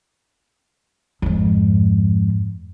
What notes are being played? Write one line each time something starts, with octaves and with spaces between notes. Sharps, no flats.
F2 G#2